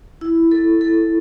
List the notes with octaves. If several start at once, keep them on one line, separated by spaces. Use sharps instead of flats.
E4
A4
A4